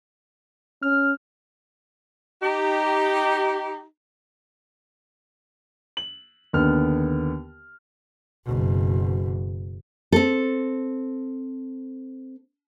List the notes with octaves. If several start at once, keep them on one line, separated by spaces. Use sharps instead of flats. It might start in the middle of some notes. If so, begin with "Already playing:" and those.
C#4 F6
D#4 G4
F#7
D#2 D3 B3 F6
F#1 B2
C4 A4